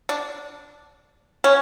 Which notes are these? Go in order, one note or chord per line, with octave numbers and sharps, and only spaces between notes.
D4
C#4